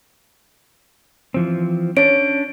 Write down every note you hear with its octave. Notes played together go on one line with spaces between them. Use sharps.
E3 F3 C4
C#4 D4 C#5 D7